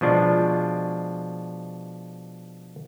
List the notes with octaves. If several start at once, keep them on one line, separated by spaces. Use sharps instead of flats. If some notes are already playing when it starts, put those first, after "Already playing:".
B2 F3 G#3 D4 F4